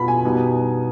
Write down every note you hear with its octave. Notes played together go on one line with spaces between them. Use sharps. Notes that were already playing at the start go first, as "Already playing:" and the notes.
Already playing: B2 B3 F4 B5
G#5
B2 G3 B3 D#4